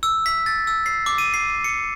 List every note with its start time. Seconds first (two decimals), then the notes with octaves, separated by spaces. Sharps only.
0.03 E6
0.26 B6
0.46 A6
0.67 E6
0.86 C7
1.06 D6
1.18 D#7
1.34 C7
1.64 C#7